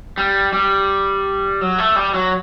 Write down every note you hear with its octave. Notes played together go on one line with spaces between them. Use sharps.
G3
G3
F#3
A3
G3
F#3